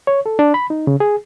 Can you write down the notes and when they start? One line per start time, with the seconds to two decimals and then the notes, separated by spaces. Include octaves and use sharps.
0.07 C#5
0.26 A4
0.39 D4
0.54 B5
0.70 D#4
0.87 C#3
1.00 G#4